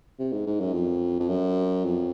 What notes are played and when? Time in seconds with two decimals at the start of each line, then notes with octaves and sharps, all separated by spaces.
0.19 C3
0.32 G#2
0.46 G#2
0.60 F#2
0.73 F2
1.20 F2
1.29 F#2
1.84 F2